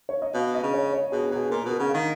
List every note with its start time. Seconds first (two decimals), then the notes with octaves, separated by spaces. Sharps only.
0.09 C#5
0.22 D#5
0.34 B2 F5
0.54 D#5
0.63 C#3
0.74 C#5
0.93 C#5
1.12 B2 G#4
1.31 B2 G#4
1.50 A#2 A#4
1.65 B2 A#4
1.79 C#3 F#5
1.89 F5
1.94 D#3